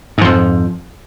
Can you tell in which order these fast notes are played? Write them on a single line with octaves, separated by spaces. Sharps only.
G#2 F3 F2